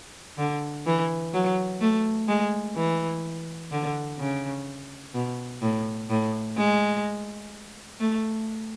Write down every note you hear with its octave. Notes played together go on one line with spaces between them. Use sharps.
D3
E3
F#3
A3
G#3
E3
D3
C#3
B2
A2
A2
G#3
A3